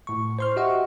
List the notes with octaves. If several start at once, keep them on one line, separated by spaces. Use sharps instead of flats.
A2 C#6
C5 C6 F6
F#4 G4 D#5 E5 F#5 C#6